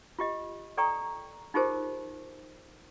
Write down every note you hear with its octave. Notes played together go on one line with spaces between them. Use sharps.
F4 G4 D#5
A4 D5 G5 A#5 C#6 D#6
D#4 F4 G4 G#4 A#4 C5